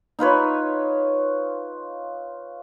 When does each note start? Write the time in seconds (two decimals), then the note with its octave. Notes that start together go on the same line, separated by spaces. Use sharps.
0.19 D#4 F4 B4 C#5